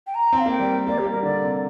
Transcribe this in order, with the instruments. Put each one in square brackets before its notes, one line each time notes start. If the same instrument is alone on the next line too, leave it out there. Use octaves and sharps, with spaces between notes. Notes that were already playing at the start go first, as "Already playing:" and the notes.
[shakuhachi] G5
A#5
[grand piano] C4
[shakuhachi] F5
[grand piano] A#3 [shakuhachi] G5
[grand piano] G3
A#3
[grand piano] A#3 [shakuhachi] D5
[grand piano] G3 [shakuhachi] G4
[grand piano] A#3
[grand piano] G3 [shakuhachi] A#4
[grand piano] D3 [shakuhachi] D5
[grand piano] C3